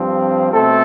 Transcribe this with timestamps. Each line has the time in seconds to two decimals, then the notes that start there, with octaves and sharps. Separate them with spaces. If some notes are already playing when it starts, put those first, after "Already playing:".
Already playing: G2 F3 C4
0.52 B2 A3 C4 A4